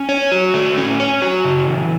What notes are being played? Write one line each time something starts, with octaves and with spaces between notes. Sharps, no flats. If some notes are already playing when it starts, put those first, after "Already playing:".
Already playing: C#4
C#5
F#4
A3
C#4
C#5
F#4
C#3
E3